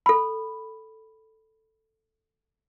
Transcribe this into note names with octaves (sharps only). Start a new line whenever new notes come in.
A4 B5